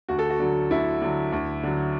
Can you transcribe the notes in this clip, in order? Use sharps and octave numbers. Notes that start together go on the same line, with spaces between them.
D2 F#4
A4
F#4
D3 F#3
D2 E4
D3 F#3
D2
D3 F#3